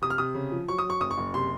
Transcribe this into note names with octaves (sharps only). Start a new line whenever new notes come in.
C3 D#6
F6
C3 D#6
C#3
F3
F#3 C#6
D#6
F#3
C#6
F#1 D#6
C#6
F#1
C3 C6